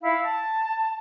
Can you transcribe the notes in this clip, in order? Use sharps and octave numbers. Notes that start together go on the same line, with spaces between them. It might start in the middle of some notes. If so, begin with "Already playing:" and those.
E4 F5
A5